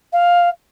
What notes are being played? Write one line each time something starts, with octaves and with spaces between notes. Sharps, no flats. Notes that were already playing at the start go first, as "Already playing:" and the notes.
F5